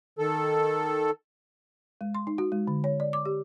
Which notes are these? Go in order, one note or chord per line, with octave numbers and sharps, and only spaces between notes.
D#3 A4
G#3
C6
D#4
F#4
G#3
D3
C#5
D5
D6
G4